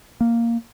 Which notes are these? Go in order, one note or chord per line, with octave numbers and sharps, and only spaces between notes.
A#3